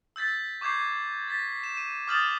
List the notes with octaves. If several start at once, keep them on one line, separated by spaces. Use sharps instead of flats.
E6 G6 A6 B6
C#6 D6 G6 G#6 C7
A6 B6
E7
D#7
D6 D#6 F6 G6 A6 F#7